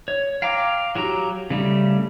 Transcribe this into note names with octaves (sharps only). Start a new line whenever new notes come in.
C#5
F5 G5 A#5 D6
F#3 F#4 G4 A#5
C#3 G3 A3